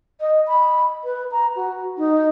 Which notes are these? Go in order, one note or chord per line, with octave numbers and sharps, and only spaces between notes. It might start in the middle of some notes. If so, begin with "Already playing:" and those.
D#5
B5
B4
A#5
F#4
D#4